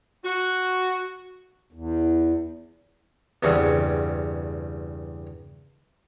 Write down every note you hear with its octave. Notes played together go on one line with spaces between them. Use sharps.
F#4
E2
E2 G2 C#3 G3 C4 F#5